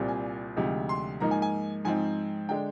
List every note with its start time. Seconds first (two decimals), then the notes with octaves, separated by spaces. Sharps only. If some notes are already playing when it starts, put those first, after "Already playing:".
Already playing: C2 A#2 G3 C4 F4
0.08 G#5
0.57 D2 C3 F3 G#3 D#4
0.89 C6
1.20 G#2 F3 A#3 D#4 A#5
1.31 G#5
1.42 G#5
1.85 G#2 F3 C4 D#4 G#5
2.49 D3 G#3 D4 G5